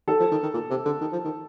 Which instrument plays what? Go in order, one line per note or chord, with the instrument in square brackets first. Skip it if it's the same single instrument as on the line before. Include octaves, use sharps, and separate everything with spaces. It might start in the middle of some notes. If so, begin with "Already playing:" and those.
[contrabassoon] D#3 [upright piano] A4
[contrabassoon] F3
D#3
D#3
A#2
C3
D3
D#3
F3
D#3